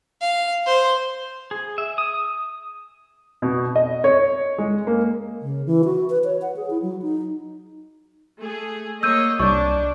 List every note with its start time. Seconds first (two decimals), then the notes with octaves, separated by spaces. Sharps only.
0.21 F5
0.66 C5
1.51 G#4
1.78 E5
1.98 D#6
3.42 B2
3.76 D#5
4.04 C#5
4.58 G#3
4.87 A#3
5.40 C#3
5.66 E3
5.85 F#4
6.10 B4
6.24 C#5
6.42 F#5
6.56 G#4
6.70 E4
6.82 F#3
7.02 D#4
8.40 A3 G#4
9.03 A#3 C#5 D#5 E6 G6 D#7
9.39 C2 D4 C#6 G6